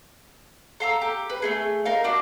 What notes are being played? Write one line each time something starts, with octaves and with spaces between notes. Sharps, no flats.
A4 F5 A#5 E6
G4
B4
A3 D#4 G#4
D#4 A#4 F5
D4 F#4